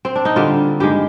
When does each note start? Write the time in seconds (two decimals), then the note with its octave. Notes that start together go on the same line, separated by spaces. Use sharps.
0.05 C4
0.16 D4
0.25 D#4
0.36 D3 G3 A#3 F4
0.80 G2 D#3 G#3 G4